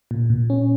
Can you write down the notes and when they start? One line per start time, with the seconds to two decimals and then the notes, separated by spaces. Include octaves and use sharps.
0.11 A#2
0.30 A#2
0.50 C#4